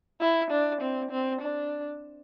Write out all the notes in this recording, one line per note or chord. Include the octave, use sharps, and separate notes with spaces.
E4
D4
C4
C4
D4